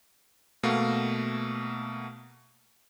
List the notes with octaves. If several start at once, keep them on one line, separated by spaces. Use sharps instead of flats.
B2 A3 A#3 F#4 F5